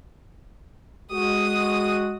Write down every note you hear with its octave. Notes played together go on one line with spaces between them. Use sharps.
G#3 F#4 D#6